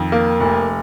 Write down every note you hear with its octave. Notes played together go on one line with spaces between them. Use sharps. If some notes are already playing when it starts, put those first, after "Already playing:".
Already playing: F2 D#3
A#3
F1